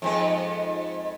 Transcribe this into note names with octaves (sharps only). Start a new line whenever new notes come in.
F2 G#2 B3